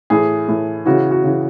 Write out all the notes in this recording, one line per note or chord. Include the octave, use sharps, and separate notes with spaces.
A2 E3 G#4
A2 E3
C#3 E3 F#4
F#4
C#3 E3